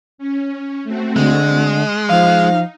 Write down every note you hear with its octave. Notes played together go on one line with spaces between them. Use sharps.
C#4
A3 C4 F#4
D3 G#3
C6 D#6
F3 D#4 F5